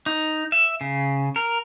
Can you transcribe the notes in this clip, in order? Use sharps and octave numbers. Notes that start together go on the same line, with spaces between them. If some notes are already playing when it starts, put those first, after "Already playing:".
D#4
E5
C#3
A#4